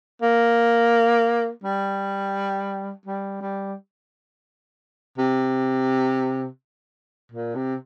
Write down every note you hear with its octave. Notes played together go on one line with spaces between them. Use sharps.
A#3
G3
G3
G3
C3
A#2
C3